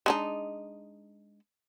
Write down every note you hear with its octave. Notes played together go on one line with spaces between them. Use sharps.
G#3 D4 D#4